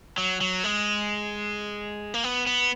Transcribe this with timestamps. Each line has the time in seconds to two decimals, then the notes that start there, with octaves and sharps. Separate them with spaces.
0.18 F#3
0.41 F#3
0.64 G#3
2.14 A#3
2.24 B3
2.47 B3